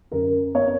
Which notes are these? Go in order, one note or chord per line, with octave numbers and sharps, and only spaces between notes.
F#2 A#4
B3 C#5